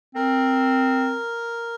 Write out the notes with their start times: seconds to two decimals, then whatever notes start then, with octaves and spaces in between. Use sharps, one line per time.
0.15 C4 A#4